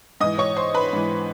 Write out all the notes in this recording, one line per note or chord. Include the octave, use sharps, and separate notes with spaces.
G#2 E3 D#5 D#6
C#5 C#6
C5 C6
B4 B5
G#2 E3